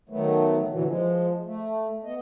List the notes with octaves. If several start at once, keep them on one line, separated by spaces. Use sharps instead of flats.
D#3 F#3 A3 B3
A#2 D3 E3 F#3
F3 G#3
A3
B3 D#5